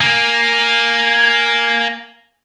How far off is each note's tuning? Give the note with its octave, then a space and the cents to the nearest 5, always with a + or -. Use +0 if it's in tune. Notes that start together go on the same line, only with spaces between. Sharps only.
A#3 +0 G#5 +0